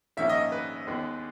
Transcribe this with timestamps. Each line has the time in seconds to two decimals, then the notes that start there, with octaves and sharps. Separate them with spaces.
0.17 A#1 G#2 D#3 A#3 C#4 E5
0.29 D#5
0.52 B4
0.87 D#2 D#3 G#3 B3